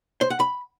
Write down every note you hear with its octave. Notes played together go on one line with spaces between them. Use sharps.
C5
F#5
B5